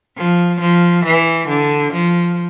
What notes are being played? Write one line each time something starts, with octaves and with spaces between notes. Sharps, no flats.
F3
F3
E3
D3
F3